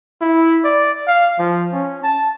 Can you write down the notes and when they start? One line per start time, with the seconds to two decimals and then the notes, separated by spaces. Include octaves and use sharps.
0.21 E4
0.64 D5
1.08 F5
1.39 F3
1.73 C#4
2.03 A5